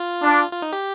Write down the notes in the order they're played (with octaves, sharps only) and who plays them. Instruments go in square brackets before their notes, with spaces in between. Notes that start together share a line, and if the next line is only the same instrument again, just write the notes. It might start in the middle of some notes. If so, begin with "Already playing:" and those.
Already playing: [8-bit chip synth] F4
[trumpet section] D4
[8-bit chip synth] F4
D#4
G4